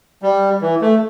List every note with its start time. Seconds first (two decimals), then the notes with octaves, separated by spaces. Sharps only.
0.22 G3
0.62 E3
0.81 A3